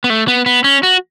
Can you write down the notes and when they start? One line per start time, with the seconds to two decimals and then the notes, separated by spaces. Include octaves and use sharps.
0.04 B3
0.10 A3
0.28 B3
0.46 B3
0.64 C#4
0.83 F#4